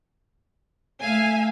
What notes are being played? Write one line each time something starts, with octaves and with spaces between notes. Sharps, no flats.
A3 E5 F5 G#5